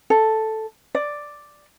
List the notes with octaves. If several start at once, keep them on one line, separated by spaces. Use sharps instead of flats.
A4
D5